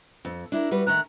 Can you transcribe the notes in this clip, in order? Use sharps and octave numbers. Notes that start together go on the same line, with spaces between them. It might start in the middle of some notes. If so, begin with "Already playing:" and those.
F2
D4 E4 A#4
G3 F#4 B4
D#3 A3 A#5 F#6